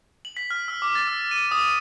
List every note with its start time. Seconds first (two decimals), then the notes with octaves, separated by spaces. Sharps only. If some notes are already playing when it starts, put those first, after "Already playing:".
0.25 F#7
0.37 B6
0.50 F6
0.68 E6
0.82 D6
0.95 A6
1.08 E6
1.31 D#7
1.51 D#6